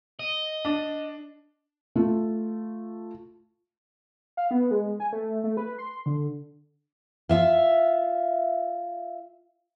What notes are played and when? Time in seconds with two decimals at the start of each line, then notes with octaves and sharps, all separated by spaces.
0.19 D#5
0.65 D4
1.96 A3 F4
4.37 F5
4.51 B3
4.71 G#3
5.00 G#5
5.13 A3
5.44 A3
5.57 B4
5.78 C6
6.06 D3
7.29 F4 E5 F5